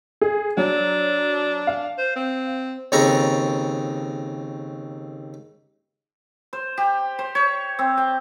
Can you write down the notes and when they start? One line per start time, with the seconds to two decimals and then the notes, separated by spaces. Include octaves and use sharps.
0.21 G#4
0.57 F#3 D4
1.67 F5
1.98 C5
2.16 C4
2.92 D#2 C#3 C4 A4 A#5 C#6
6.53 C5
6.78 G4
7.19 C5
7.35 C#5
7.79 C4
7.97 G5